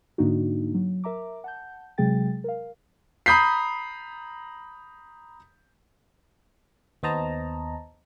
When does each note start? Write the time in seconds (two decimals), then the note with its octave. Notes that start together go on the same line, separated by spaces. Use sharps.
0.18 G#2 D3 A#3 D4 D#4 F#4
0.75 F#3
1.04 A#4 E5 A#5 D6
1.44 F#5 A5 G6
1.98 C3 F#3 G#3 G#4 G5 A6
2.44 A#4 F5
3.26 A#5 B5 D#6 G6 B6 C7
7.03 D#2 B3 C5 D#5 A5 A#5